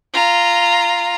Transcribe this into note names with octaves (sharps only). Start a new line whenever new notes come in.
F4 A#5